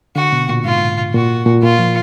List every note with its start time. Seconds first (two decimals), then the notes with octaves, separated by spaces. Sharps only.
0.16 D3 F#4
0.33 B2
0.49 A#2
0.65 G#2 F4
1.14 A#2 F#4
1.46 A#2
1.63 A#2 F4
1.79 F3